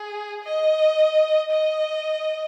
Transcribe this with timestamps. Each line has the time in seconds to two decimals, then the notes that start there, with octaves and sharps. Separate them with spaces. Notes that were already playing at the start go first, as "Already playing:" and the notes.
Already playing: G#4
0.44 D#5
1.51 D#5